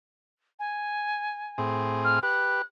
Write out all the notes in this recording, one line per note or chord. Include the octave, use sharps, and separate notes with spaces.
G#5
A2 C4 G#4
F6
G4 B4 F#6